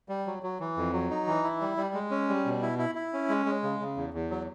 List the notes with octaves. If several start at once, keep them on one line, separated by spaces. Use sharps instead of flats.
G3
F#3
F#3
E3
F2
F#3
D#4
E3
E4
G3
G3
G#3
C#4
G3
B2
E4
E4
E4
C#4
G#3
G#3
C#3
C#3
E2
E2
F#3